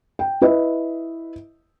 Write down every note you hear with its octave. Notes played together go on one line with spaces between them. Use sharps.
G5
E4 B4 D#5 E5